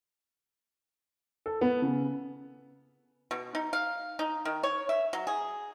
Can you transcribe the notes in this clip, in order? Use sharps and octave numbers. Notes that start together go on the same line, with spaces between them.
A4
B3
C#3
B2
D#4
F5
D#4
D#3
C#5
E5
F#3
G#4